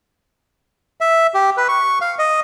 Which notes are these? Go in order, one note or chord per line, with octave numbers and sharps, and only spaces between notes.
E5
G4
B4
C#6
F5
D#5